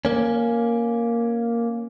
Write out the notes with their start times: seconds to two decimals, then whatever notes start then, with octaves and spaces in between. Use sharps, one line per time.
0.05 A#3 C#4